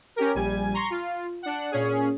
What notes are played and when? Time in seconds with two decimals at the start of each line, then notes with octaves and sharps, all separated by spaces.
0.16 C#4 G4 A#4
0.35 A#1 G3 G#5
0.74 A#5 C6 C#6
0.90 F4
1.43 D4 F#5
1.71 A#2 C#4 G#4